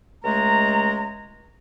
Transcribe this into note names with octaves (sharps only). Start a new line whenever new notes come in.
C#2 G#3 A3 A#5